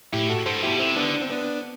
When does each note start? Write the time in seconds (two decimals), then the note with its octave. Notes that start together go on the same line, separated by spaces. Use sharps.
0.13 A2 E4 G4
0.29 F#4 A4
0.46 G2 A4 C5
0.63 B2 E4 G4
0.79 C3 C4 E4
0.96 D3 B3 D4
1.13 D4
1.22 C4
1.31 B3 D4